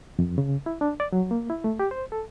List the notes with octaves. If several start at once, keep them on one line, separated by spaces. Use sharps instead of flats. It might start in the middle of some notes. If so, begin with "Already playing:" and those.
F2
C#3
E4
D4
D5
F#3
A#3
E4
A3
G4
C5
A4